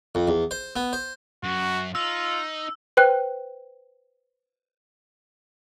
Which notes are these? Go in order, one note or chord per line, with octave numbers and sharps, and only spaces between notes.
F2
E2
C5
B3
C5
F#2 F#4
D#4 F4 E6
B4 C5 G5 F#6